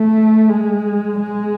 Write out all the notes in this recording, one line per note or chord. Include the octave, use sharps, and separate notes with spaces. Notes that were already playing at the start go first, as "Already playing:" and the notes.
Already playing: A3
G#3
G#3